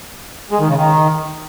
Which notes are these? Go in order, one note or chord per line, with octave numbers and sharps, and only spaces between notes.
G#3
D#3
C#3
D#3